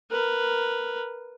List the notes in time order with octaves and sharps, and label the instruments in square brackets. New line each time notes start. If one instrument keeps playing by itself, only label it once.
[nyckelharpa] A#4 B4